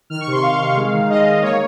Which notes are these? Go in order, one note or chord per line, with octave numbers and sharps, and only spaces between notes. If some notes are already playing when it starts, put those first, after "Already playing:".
D#3 F6
C#6
C3
C6
C3 F5
D#3
G#3
D#3
G#3 D#5
G#3
A#3 C#5